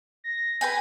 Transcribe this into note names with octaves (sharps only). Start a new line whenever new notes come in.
A#6
B4 G5 G#5